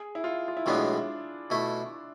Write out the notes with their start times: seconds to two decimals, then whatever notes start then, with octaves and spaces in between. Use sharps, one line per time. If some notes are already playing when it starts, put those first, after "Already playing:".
Already playing: G#4
0.15 E4
0.24 F4
0.48 F4
0.57 E4
0.66 B1 A2 E3 G#3 B3 D4
1.50 B2 A3 E4